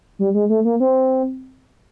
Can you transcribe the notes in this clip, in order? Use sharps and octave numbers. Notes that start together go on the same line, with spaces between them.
G3
G#3
A3
A#3
C4